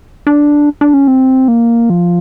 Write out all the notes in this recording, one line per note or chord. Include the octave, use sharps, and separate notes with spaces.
D4
D4
C#4
C4
A#3
F3